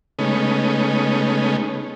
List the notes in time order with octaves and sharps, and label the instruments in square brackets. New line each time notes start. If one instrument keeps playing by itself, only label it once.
[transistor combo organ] C#3 G#3 A3 B3 C#4 D#4